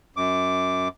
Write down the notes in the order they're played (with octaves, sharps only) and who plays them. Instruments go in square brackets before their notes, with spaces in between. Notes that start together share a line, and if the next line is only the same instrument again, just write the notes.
[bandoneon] F#2 D6